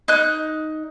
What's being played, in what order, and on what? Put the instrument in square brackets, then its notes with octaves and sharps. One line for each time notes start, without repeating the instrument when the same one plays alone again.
[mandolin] D#4 F#6